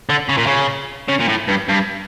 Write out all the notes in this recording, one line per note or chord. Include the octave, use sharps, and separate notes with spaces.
D3
C#3
A#2
C#3
C#3
A#2
A2
G2
G2